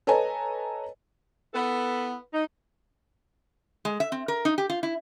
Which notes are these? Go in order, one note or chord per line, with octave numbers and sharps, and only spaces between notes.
A4 B4 C#5 D#5 G#5 A#5
B3 E4 A4 B4
D#4
G#3
E5
C4
A#4
D#4
G4
F4
E4